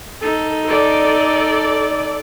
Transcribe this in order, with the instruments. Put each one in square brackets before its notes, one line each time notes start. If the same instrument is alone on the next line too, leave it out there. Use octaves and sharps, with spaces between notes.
[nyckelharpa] D#4 [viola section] A4
[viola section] A4 D5